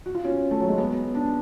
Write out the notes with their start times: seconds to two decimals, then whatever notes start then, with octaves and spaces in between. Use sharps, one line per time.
0.06 F#4
0.15 F4
0.24 C#4
0.51 A3
0.60 F#3
0.69 G#3
0.78 B3
1.15 D4